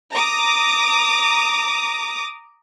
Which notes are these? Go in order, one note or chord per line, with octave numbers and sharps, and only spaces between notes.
A#5 D6 D#6